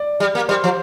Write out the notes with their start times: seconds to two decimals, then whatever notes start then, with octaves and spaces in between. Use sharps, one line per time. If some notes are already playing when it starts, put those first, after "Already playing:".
Already playing: D5
0.20 G3
0.35 A#3
0.49 G3 C5
0.64 F3